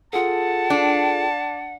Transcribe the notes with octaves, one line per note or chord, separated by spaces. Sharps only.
F4 G#4 A4 F#5 A5
D4